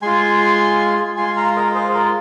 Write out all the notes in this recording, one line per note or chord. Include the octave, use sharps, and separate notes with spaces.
G#3 F4 G#5 C6
G#3 F4 G#5 C6
F5 A#5
A#4 D#5
G#4 C5
A#4